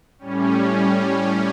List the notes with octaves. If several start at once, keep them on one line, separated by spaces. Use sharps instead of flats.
A2 G3 C#4
C#4